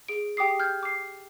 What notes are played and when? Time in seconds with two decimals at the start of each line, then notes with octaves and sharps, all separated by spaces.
0.08 G#4 D7
0.37 G4 G5 D6 D#6 C7
0.60 F6 G6 G#6
0.83 D6 C7